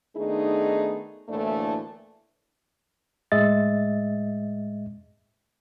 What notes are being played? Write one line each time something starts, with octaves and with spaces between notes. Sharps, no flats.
D#3 A3 B3 D4 D#4 G#4
D2 A2 E3 A3 A#3 D4
A2 G#3 D#5 E5 A6